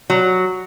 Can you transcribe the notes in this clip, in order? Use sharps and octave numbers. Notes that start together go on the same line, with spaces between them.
F#3